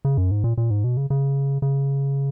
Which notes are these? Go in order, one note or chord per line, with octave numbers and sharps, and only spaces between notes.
C#3
F#2
G#2
A#2
A#2
G#2
B2
C#3
C#3
C#3